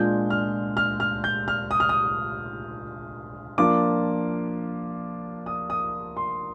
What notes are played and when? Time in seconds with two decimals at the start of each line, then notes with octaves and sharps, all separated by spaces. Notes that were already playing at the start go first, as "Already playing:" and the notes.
Already playing: A#2 G#3 D4 F4 G6
0.30 F6
0.77 F6
1.00 F6
1.24 G6
1.48 F6
1.71 D#6
1.80 F6
1.89 D#6
3.58 F3 A#3 D4 F4 D6
5.46 D#6
5.70 D#6
6.17 C6